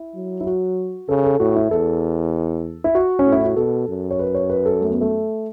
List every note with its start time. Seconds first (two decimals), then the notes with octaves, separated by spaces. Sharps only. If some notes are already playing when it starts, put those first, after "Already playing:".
Already playing: E4
0.16 F#3
0.41 E4
0.47 F#4
1.08 C#3 A4
1.24 A4
1.40 A2 F#4
1.56 E4
1.71 E2 A4
2.84 E4
2.95 F#4
3.19 C#4
3.26 A2
3.32 E4
3.44 F#4
3.56 B2 A4
3.89 F#2
4.11 C#5
4.19 B4
4.35 C#5
4.50 B4
4.65 A4
4.81 A3
4.91 B3
5.01 A3